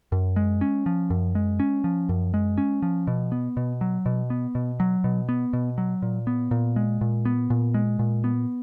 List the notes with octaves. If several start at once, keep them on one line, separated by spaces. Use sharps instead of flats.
F#2
G#3
C#4
F3
F#2
G#3
C#4
F3
F#2
G#3
C#4
F3
B2
B3
B2
F#3
B2
B3
B2
F#3
B2
B3
B2
F#3
A#2
B3
A#2
G#3
A#2
B3
A#2
G#3
A#2
B3